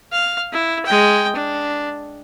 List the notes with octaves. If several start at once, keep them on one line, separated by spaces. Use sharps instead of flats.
F5
E4
G#3 G5
D4